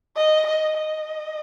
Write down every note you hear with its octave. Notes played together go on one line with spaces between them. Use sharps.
D#5
D#5
D#5